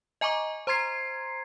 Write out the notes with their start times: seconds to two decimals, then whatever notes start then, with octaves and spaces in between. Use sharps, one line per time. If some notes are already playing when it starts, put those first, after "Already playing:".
0.21 D#5 G#5 A#5 C#6 D6
0.67 C5 A#5 C6 G#6 C7